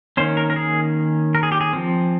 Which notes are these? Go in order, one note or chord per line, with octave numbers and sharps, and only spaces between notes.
D#3 A#3 C#4 C5
A#4
A#4
G#4
A#4
G#4
G4
G#4
F3 C4